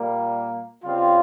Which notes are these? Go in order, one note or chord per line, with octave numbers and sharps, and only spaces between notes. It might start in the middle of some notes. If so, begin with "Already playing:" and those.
Already playing: A#2 G3 A#3
C#3 G3 C4 F4